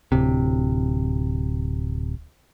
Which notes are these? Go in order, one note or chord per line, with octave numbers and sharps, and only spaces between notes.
D1 C3